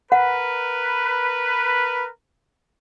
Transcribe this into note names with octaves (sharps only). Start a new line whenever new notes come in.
A#4 B4 F#5